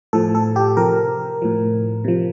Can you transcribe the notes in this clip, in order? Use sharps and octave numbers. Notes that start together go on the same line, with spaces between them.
A2 F3 A4
A4
G4
C3 F3 A#4
A2 F3
C3 F3